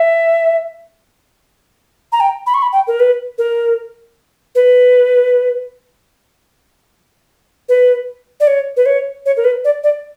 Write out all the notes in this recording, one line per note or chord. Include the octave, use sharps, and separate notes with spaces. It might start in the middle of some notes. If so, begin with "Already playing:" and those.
Already playing: E5
A#5
G5
B5
C#6
B5
G5
A#4
B4
A#4
B4
B4
D5
C#5
B4
C#5
C#5
A#4
B4
D5
D5